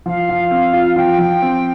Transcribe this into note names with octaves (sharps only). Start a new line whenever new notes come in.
F3 F5
F3
C4
F4
F3 G5
F3
C4